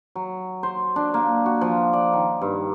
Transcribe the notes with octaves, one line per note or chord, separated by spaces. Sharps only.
F#3
C5
D4
A#3
F#4
F3
D5
D#3
G2